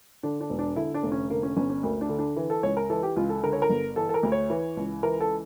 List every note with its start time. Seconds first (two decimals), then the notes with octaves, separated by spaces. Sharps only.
0.23 D3 D4
0.41 D4
0.50 E1
0.59 D4
0.76 D3 E4
0.94 D4
1.03 F1
1.12 C#4
1.30 D3 A#3
1.43 C#4
1.56 G1 C#4
1.70 C#4
1.83 D2 A#3
2.01 D4
2.09 D3
2.19 D4
2.36 E3
2.50 A4
2.63 C#2 C#5
2.77 A#4
2.90 E3 A4
3.03 G4
3.16 C#2 F4
3.29 A4
3.43 D3 A#4
3.53 C#5
3.62 A#4
3.69 G1
3.96 E3 A4
4.09 A4
4.14 A#4
4.23 D2
4.32 C#5
4.50 E3
4.77 C#2
5.03 E3 A#4
5.20 A4